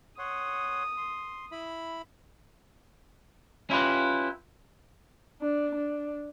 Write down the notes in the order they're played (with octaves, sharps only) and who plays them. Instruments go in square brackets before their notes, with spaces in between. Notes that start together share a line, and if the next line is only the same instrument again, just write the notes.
[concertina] C#5 F#5 C6 [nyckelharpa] D#6
[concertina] C6
E4 B5
[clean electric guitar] C#4 E4 F4 G4 B4
[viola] D4
D4